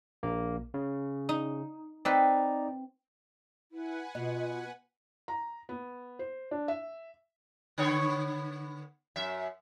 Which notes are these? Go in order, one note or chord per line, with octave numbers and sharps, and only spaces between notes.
A#1 A#3
C#3
D#4
C4 D#4 B4 D5
E4 B4 F#5 G#5
B2 F4 D#5
A#5
B3
C5
D4
E5
D3 B3 C#5
F#2 E5